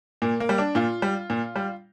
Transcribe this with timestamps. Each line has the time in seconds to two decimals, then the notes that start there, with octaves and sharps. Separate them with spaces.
0.22 A#2 A#3
0.40 A#3
0.49 G3
0.58 D4
0.75 A#2 F4
1.02 G3
1.30 A#2
1.56 G3